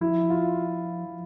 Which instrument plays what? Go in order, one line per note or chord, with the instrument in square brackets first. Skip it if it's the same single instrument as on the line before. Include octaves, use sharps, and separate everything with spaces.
[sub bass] F3 [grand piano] E4
[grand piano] F4